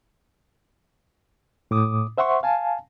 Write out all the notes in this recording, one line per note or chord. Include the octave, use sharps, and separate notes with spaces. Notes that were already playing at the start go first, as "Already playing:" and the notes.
A2 D6 D#6
C5 E5 F#5 C6 C#6
F5 G#5 A5